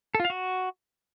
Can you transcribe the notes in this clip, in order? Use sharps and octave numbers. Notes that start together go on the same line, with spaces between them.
A4
F4
F5
F#4